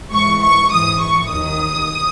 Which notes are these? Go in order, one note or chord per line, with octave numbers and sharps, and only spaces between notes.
G#2 E3 C#6
C#6
G#2 E3 D#6
C#6
D#2 D#3 D#6